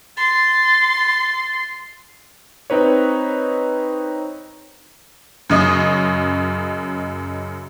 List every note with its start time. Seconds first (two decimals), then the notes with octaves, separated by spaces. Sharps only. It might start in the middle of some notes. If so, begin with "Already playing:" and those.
0.17 C6 A6
2.70 C4 D#4 B4 C#5
5.50 F#2 C#3 D#5 C#6